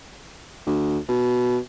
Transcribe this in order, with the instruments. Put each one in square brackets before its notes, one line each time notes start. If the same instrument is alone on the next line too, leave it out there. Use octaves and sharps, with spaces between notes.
[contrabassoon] D2
B2